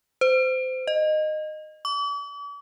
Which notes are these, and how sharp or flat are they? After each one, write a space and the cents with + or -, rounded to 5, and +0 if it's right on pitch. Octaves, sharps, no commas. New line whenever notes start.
C5 -25
D#5 -15
D6 -45